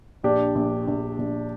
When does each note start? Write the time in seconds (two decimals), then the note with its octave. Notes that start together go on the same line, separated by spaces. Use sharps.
0.23 A#1 D4 G4
0.55 A#1
0.87 A#1
1.18 A#1